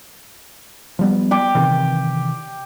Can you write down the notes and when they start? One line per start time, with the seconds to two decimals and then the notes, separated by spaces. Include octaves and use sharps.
0.99 F3 G3 B3
1.31 G4 G5 D6
1.55 C3 D#3 E3